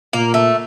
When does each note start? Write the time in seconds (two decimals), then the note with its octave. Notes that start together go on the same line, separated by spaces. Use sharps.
0.13 A#2 A#3
0.34 A3